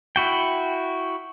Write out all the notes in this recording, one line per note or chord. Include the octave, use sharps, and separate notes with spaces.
E4 F#4 G5